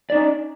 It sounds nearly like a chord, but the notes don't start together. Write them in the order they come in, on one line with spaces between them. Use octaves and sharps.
D5 D#4 C#4